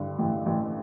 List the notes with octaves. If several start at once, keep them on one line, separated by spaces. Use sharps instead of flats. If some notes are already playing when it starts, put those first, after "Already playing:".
Already playing: G2 D3
A1
A1